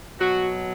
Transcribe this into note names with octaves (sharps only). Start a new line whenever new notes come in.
B2 F#3 F#4